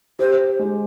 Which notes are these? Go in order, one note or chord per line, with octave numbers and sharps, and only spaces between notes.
G4 C5
G#3